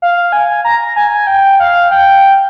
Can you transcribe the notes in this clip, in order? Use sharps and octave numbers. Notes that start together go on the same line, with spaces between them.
F5
G#5
A#5
G#5
G5
F5
G5